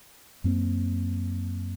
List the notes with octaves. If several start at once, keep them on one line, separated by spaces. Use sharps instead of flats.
F#2 A#3 C4